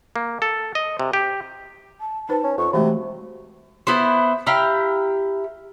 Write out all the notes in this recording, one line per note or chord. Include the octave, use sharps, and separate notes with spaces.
A#3
A4
D#5
C3
G4
A5
D#4 B4 C5 A5
C#4
F2 C#6
C3 E3 G#3 A3 F#4
B3 E4 B4 C5
E4 G4 F5 A#5